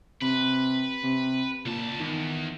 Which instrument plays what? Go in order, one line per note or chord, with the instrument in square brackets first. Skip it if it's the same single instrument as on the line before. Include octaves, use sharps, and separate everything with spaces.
[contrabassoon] C3 [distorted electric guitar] B4
[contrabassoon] C3
[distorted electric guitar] C#2 A5 [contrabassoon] A#2
[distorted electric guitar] E2 [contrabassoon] D#3